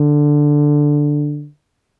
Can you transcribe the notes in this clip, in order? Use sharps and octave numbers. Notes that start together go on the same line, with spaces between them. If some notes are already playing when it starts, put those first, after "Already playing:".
Already playing: D3